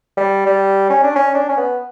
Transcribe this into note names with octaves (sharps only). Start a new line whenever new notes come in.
G3
G3
C#4
D4
C#4
D4
C#4
B3